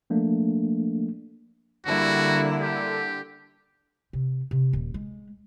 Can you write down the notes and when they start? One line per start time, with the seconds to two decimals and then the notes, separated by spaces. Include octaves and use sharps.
0.10 F3 A3 A#3 D4
1.86 D3 G3 A#3 E4 F#4
2.61 G4
4.13 C3
4.51 C3
4.73 D#1
4.94 G#3